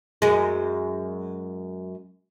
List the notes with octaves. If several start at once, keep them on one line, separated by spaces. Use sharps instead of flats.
F#2 G#3